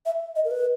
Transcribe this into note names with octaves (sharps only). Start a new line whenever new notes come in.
E5
D#5
A#4
B4